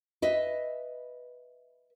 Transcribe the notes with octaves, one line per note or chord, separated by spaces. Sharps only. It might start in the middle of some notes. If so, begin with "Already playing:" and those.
B4 D#5 E5